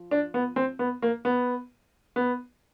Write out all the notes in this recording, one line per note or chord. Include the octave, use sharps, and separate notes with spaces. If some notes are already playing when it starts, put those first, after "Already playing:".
Already playing: F3
D4
B3
C4
B3
A#3
B3
B3